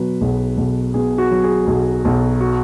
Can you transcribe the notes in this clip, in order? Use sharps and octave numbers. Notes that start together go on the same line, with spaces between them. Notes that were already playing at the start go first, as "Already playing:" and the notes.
Already playing: B2 F#3 B4
B1 G#4
B1
B2 G#4
F#4
F#3
G#4
B1
B1
F#4